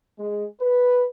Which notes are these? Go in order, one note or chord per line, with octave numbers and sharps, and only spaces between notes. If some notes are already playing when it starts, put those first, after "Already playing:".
G#3
B4